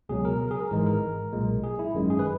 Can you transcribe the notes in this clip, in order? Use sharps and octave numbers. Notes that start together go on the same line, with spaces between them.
C#2 B2 F#3 G#4
A#4
A#4
G#4
A#4
G#1 G#2 E3 G#3 A#4
A#4
B1 A#2 G#3
G#4
E4
G#1 F#2 D#3 G#3
G#4
B4